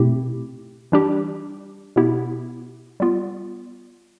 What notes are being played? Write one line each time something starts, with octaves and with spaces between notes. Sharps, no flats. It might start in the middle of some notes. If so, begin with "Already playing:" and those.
Already playing: B2 A3 C4 E4 G4
E3 G3 D4 G4
B2 B3 E4 G4
G3 B3 F4